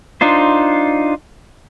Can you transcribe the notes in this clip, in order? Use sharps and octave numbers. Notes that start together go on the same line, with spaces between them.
D4 D#4 F4 C5